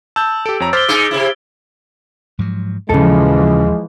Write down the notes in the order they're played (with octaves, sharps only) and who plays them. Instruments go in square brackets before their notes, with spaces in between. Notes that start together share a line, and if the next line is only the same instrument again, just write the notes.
[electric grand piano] A5 G6 [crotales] E6
[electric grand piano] G4 A4 [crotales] D7
[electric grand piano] F2 C#5 A#5
[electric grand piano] C5 D6 F6 [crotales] A6 B6 G7
[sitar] G#2 G#3 D#4 [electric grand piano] D6 [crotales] A6 D7
[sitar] C3 E4
[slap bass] G#2 F3 F#3
[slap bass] D#2 A#2 [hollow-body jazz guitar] C#3 A4 [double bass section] E3 F3 [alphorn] G#3